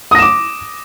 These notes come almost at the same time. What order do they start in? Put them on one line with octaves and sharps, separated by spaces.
D#6 A#6 E7 D6